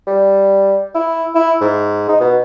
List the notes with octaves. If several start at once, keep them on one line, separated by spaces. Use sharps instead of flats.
G3
E4
E4
G#2
D#4
B2